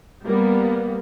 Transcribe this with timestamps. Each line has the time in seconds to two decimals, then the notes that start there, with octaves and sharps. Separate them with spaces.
0.23 G3 A#3 B3